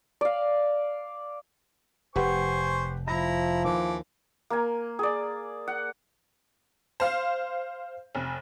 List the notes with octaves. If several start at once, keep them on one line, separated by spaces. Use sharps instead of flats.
D5 F5
F1 G4 B4 C5 F#5 G#5 C#6
F3 E4 A#5 B5 A#6
D#2 E3 D6
A#3 G#5
G#4 D5
F#5
C5 F5
F1